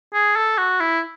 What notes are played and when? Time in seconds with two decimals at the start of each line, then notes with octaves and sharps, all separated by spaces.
0.14 G#4
0.36 A4
0.58 F#4
0.80 E4